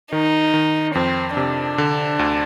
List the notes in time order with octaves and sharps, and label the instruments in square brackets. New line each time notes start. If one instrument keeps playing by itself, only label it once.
[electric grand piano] D#3 [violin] D#4
[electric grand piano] D#3
[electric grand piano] F2 [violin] C4
[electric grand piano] C3 [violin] D4
[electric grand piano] D3
D2